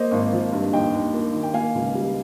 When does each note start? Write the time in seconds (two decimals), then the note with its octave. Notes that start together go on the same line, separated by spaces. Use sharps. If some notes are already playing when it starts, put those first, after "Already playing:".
Already playing: A#3 C5 D#5
0.12 G#1
0.32 F3
0.52 G2
0.73 D#2 D#5 G5
0.94 D#2
1.13 A#3
1.33 D#3
1.43 G5
1.54 A#3 F5 G#5
1.75 C#2
1.95 G3